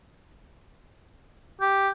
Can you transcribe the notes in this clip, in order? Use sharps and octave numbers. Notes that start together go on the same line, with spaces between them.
G4